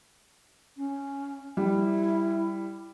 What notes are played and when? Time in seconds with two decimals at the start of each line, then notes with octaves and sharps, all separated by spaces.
0.77 C#4
1.57 G3 E4